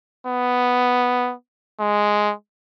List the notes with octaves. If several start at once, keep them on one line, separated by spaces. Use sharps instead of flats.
B3
G#3